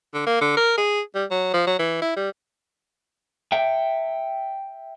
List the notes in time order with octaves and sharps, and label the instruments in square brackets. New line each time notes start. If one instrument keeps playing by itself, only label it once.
[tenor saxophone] D3
A#3
D3
A#4
G#4
G3
F#3
F3
F#3
E3
E4
G3
[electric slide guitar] E5 G5